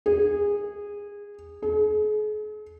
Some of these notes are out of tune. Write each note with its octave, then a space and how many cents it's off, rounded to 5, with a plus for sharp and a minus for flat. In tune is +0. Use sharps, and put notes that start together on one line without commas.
G#4 -20
G#4 +40